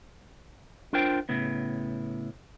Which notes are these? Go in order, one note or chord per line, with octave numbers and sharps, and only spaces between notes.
D4 F4 A#4 C5 G5
A2 C#3 B3